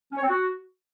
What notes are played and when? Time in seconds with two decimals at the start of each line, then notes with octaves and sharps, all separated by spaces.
0.12 C#4
0.18 C#5
0.23 C4
0.29 F#4